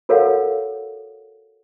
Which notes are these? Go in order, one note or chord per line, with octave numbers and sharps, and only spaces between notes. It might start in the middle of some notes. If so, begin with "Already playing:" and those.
F#4 A4 A#4 C#5 F5 F#5